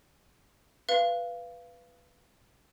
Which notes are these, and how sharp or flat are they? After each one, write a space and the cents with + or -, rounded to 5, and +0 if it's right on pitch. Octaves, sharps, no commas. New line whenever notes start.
B4 +0 F5 -20